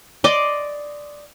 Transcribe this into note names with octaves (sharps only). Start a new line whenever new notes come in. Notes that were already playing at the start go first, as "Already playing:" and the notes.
D5 D#5 C6 D6